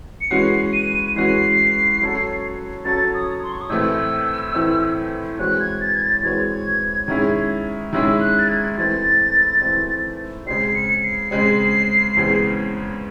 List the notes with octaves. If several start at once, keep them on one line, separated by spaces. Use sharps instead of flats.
C#7
E3 G#3 C#4 F#4 C7
D#7
E3 G#3 C#4 F#4 C7
F#3 C#4 F#4 A4 C#5
F#3 C#4 F#4 A4 C#5 A6
D#6
C6
C#6
D#6
A2 E3 A3 C4 E6
A2 E3 A3 C4
E3 G#3 C4 F#4 C#5 F#6
G#6
A6
G#6
A6
E3 G#3 C4 F#4 C#5 G#6
D#3 G#3 C#4 E4 G#4
D#3 G#3 C#4 E4 G#4 E6
F#6
A6
G#6
E3 A3 C4 A6
E3 A3 C4
C#3 G#3 C4 C7
C#7
C7
C#3 G#3 C4
E2 C#3 G#3 C4